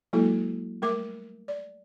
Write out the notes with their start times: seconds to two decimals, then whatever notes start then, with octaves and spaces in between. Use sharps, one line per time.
0.13 F#3 G#3 A#3 E4 F#4 A4
0.82 G3 A3 A#4 E5 D6
1.48 D5